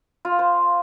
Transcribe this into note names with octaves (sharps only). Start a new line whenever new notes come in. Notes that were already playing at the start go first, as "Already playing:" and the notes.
F4
F5
C5